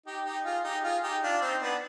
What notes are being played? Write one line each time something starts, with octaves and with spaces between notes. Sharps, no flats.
D#4 G4
D#4 G4
F4 G#4
D#4 G4
F4 G#4
D#4 G4
D4 F4
C4 D#4
B3 D4